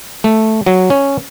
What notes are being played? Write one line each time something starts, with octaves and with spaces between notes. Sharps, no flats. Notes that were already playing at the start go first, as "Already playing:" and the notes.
A3
F#3
C#4